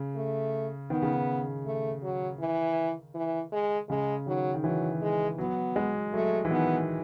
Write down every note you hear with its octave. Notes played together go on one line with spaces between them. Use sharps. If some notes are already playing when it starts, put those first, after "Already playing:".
Already playing: C#3
A3
D#3 B3
C#3
D#3
A3
F#3
E3
E3
G#3
C#3 G#3
D#3 F#3
D#3
E3 F#3
G#3
F#3 B3
G#3
F#3 A3
E3
D#3 B3